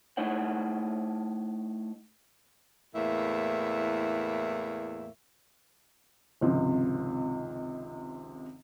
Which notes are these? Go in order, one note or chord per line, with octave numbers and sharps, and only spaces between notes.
A3 D#4 E4 C#5 F#5
E2 A2 A#3 E5
G#1 C#2 C3 F3